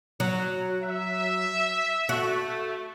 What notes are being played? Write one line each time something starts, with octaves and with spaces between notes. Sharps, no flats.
F#3
E5
A3 F#4